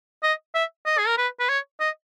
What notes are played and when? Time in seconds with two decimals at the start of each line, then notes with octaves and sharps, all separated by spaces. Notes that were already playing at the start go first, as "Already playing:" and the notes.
0.23 D#5
0.55 E5
0.86 D#5
0.98 G#4
1.07 A#4
1.18 B4
1.40 B4
1.49 C#5
1.80 D#5